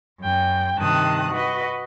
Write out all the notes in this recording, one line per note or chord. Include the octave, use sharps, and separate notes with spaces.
F#2 G5
G2 C3 D#3 A5 D#6 F#6
F#4 B4 D#5